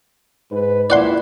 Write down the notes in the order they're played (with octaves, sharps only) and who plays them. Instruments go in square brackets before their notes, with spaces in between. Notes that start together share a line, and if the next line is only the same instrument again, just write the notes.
[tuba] G#2 [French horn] B4
[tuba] A#2 [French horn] E4 [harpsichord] D5 F#5 C6